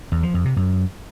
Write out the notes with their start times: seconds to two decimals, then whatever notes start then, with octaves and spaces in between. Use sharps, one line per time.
0.12 E2
0.23 F3
0.34 F2
0.45 C3
0.56 F#2